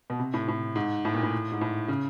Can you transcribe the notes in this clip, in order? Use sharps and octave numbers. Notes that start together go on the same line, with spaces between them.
B2
C3
A2
A2
G#2
A2
A#2
A2
G#2
A2
C#3